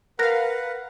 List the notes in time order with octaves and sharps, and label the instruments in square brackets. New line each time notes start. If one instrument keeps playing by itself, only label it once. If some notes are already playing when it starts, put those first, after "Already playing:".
[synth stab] A#4 F5 [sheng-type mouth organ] B4 F#5 [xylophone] F#6 A#6